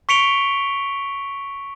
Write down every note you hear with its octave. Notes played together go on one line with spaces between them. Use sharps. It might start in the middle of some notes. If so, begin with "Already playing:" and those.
C#6 B6 C#7 D7 F7 G7